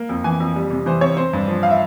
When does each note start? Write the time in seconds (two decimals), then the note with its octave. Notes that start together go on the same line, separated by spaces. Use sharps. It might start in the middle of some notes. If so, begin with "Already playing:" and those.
Already playing: A#3
0.09 F2
0.24 E3 G#5
0.40 F2
0.56 G3
0.70 C3
0.86 E3 C5
1.01 C4 C#5
1.17 C4 C5
1.33 G2
1.48 F3
1.63 F5
1.70 E5